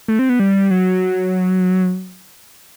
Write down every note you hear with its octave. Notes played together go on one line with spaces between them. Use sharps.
A3
C4
B3
G3
F#3